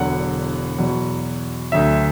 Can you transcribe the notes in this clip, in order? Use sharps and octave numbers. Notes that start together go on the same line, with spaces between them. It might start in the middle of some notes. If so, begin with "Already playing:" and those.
Already playing: E1 E2 D3 F#3 F#5
E2 B2 F#3
D2 D3 F#3 E5